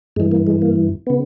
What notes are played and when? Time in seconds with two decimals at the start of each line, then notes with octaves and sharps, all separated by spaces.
0.16 G2 G#3
0.20 E3
0.31 A#3
0.47 G#3
0.62 A#3
1.07 C#3 B3